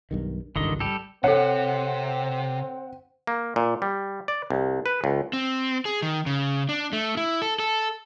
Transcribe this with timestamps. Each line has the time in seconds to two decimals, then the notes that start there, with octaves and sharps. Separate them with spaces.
0.11 B1 G2 D#3
0.56 G#1 C#2 G2 D3 D#3 D#5
0.80 G3 G4 A4
1.24 C3 C4 A4 C#5 F#5
3.27 A#3
3.56 A#2
3.82 G3
4.28 D5
4.50 C2
4.86 B4
5.04 C#2
5.33 C4
5.85 G#4
6.02 D#3
6.26 C#3
6.69 D4
6.93 A3
7.17 E4
7.42 A4
7.59 A4